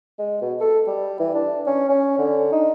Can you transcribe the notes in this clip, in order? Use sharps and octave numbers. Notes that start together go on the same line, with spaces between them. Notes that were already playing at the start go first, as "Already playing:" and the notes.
G#3
B2
A4
G3
E3
D4
C#4
C#4
D3
D#4